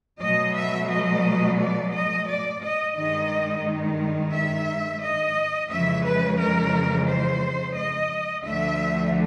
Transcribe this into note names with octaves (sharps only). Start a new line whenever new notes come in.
B2 F#3 A3 D#5
E5
D#5
D5
D#5
D5
D#5
G2 D#3 G#3 D#5
E5
D#5
F2 C#3 E3 G#3 E5
B4
A#4
C5
D#5
D2 D3 F3 A3 E5